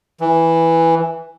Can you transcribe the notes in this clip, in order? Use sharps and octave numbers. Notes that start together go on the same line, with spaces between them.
E3